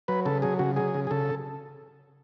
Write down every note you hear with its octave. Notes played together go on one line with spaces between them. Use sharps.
F#3 B4
C#3 A4
F#3 G#4
C#3 F#4
F#3 G#4
C#3
G#4
C#3 A4